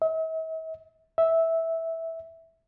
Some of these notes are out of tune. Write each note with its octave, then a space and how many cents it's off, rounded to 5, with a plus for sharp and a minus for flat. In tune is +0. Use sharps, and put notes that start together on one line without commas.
E5 -45
E5 -10